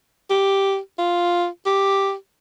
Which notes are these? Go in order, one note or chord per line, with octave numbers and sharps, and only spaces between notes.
G4
F4
G4